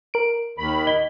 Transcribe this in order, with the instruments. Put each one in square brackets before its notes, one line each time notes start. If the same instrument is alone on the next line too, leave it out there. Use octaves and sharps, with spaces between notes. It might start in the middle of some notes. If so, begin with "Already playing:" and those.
[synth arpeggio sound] A#4 D7
[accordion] D#2 D#3 B5
[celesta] D#5 G7